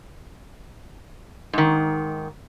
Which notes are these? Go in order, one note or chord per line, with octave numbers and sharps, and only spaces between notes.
G#2 D#3